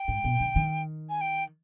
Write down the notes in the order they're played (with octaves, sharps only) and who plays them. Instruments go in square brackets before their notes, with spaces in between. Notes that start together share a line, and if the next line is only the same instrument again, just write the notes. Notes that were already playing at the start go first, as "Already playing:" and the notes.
Already playing: [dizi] G5
[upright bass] G#2
B2
D3
D#3
[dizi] G#5
G5